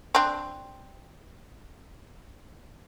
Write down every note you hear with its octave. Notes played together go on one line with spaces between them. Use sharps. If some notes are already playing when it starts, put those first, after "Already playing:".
C4 D4